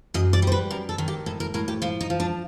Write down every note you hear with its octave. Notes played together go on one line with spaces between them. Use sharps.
F#2 D#5
D5
G3 C5
B4
F#2 A#4
A4
D#3
G4
A2 A4
A#4
A2 A#4
G4
F3 F4
D#4
F3
D4